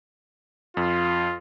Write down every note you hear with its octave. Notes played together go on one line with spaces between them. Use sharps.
F2 F4